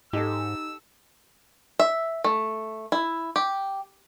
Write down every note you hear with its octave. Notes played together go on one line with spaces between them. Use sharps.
G#2 D#4 G4 A4 E6
E5
A3
E4
G4